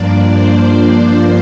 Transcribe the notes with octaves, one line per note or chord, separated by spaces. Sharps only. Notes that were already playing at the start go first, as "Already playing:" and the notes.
Already playing: G2 F3 A#3 D4 D5
C5
D5